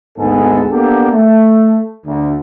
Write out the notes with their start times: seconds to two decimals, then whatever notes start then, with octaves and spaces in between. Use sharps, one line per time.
0.18 G#1 D2 G#2 B3 G#4 A4
0.71 A#3 B3 D4 G4 A4
1.12 A3
2.06 D2